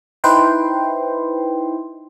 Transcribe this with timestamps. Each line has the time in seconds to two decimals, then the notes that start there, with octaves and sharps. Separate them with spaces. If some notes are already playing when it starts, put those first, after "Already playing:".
0.24 D#4 E4 B4 C5 G5 C6